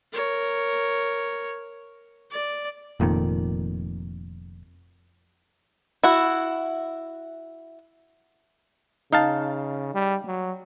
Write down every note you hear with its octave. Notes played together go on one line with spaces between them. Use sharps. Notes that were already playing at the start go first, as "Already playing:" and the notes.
A#4 C#5
D5
F1 F2 A#2 D#3
E4 F#4
C#3 D#4 F5 A5
G3
F#3